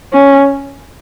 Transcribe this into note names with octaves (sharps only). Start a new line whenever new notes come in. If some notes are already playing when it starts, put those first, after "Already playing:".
C#4